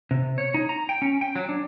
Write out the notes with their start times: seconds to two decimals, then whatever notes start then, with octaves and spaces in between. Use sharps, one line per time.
0.11 C3
0.38 C#5
0.54 D#4
0.69 A#5
0.89 G5
1.02 C#4
1.21 G5
1.36 F#3
1.49 D4